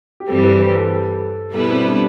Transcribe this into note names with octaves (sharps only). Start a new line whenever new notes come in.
G4
G2 E3 G3 C4 A4
B4
C5
A4
B2 G3 B3 E4 A4 B4
C4
D4